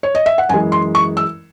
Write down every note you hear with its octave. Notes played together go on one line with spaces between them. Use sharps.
C#5
D#5
E5
F#5
F#2 E3 G#3 G#5
C6
C#6
E6